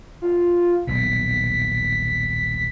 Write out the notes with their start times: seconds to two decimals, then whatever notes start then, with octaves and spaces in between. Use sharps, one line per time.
0.22 F4
0.87 D#1 B1 B2 B6